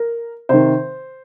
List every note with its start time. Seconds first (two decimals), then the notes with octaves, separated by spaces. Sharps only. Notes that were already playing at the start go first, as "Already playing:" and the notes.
Already playing: A#4
0.49 C3 D#3 C5